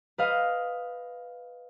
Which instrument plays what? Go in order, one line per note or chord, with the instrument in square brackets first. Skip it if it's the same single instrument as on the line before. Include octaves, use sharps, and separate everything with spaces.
[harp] B4 D#5 F5